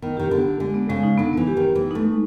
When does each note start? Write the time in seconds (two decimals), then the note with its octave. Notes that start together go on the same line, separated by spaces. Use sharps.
0.02 D#3 B3
0.17 D#3 G4
0.31 D3 B3
0.46 G4
0.60 D3 G#3
0.74 B3
0.89 C#3 G#3
1.03 D#4
1.18 D3 B3
1.33 E3 B3
1.47 G4
1.57 D#3 B3
1.75 E3 B3
1.91 A3 D#4
2.04 G#3